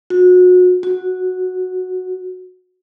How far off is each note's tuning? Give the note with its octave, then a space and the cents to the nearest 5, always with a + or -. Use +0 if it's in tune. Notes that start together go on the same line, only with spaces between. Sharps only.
F#4 -30
F#4 -5